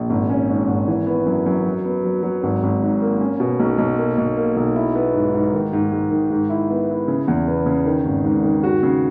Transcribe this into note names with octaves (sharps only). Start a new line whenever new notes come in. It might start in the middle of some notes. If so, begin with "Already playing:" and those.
Already playing: A#1
G#1
C#4
G#2
G#1
E3
B3
F#2
F#2
F#3
B3
F#3
F#3
G#1
G#1
G#2
A#3
C#4
B2
B1
B1
A#3
B1
A#3
B1
E4
B3
G#2
G#2
D#3
G#2
G#2
D#3
G#2
E4
B3
E4
C#3
E2
B3
C#3
D#3
G#1
G#2
D#3
F#4
C#3